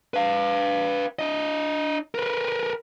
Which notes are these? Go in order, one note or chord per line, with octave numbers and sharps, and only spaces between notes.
B4 F5
D4 D#5
A#4 B4